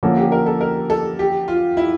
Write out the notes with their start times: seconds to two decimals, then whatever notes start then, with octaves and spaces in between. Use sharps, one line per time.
0.03 D3 F3 A#3 C#4 A4
0.17 G4
0.32 A#4
0.46 A4
0.61 A#4
0.90 A4
1.19 G4
1.48 F4
1.77 E4